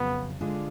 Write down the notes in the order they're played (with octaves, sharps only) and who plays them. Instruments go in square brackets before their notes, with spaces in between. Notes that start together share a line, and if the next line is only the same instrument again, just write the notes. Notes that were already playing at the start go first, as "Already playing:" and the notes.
Already playing: [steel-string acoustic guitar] F2 C#3 F#3 [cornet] B3
[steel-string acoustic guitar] D3 G#3 D4 F4 G#4